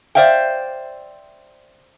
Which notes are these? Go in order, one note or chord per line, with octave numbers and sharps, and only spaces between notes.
C5 D5 E5 F5 G5